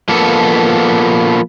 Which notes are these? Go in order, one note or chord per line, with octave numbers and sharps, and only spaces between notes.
F3 A#3 B3 A4